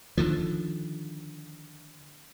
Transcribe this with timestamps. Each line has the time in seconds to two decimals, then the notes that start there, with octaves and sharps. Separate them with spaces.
0.18 D3 D#3 F3